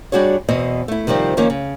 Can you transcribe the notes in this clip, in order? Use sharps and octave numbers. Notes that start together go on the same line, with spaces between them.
G3 D4 F#4 G#4 C#5
E2 B2 C4 D#5
A3 E4
C3 D#3 F3 G3 C4
D#3 F3 A#3 C#4
C#3